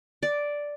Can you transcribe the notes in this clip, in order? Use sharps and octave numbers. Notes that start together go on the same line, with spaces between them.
D5